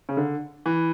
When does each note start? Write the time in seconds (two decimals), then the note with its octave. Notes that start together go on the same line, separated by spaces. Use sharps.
0.09 C#3
0.17 D3
0.66 E3